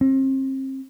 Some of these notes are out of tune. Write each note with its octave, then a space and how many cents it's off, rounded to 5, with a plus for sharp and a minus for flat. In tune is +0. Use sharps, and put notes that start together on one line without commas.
C4 +35